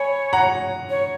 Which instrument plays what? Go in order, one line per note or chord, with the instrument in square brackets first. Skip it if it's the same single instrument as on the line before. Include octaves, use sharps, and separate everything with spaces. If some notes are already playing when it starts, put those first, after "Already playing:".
Already playing: [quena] C#5 [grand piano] G#5 B5
[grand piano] F#5 A#5
[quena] C#5